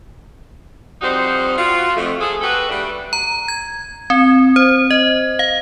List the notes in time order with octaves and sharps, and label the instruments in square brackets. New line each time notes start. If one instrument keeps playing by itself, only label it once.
[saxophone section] F2 G3 D#4 F#4 C5
F4 F#4
F2 A3
G#4 A4
F#4 G4 A4 B4
G3 A3 D4
[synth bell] A#5
G#6
C4
C5
D#5
F5